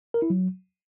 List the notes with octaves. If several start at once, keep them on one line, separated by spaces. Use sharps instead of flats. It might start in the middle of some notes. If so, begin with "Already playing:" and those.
A#4
E4
F#3